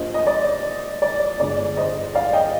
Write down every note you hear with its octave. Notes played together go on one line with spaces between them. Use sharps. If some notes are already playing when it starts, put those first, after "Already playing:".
Already playing: G2 F3 A#3 C5 D#5
D#5
D5
D5
G1 G2 D3 G#3 D5
C5 D#5
D5 F5
D#5 G5